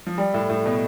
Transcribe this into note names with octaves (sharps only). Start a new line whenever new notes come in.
F3
G3
A2
A2
B2